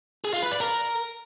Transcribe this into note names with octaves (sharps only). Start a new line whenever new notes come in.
G#4
F4
B4
D5
A#4